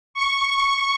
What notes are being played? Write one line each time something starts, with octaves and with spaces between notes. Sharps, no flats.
C#6